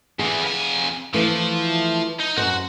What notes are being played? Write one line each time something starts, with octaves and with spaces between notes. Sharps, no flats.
E2 E3 G#4
F2 G#5
E3 F3 A3
D#4
F#2 A#2 F#4 C5